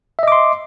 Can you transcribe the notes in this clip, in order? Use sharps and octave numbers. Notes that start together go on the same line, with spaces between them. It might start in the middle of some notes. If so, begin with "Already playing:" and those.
D#5 E5 C6 D6